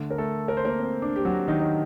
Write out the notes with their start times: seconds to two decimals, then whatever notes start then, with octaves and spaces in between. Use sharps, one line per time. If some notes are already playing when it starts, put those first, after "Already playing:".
Already playing: D3 A3
0.11 A#4
0.18 A3 A4
0.48 A#4
0.57 C5
0.65 A#3 A#4
0.79 C4
1.02 D4
1.16 G4
1.25 F#3 F#4
1.48 D#3 D#4
1.60 D#4